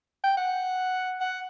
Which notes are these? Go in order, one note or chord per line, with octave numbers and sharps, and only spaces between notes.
G5
F#5
F#5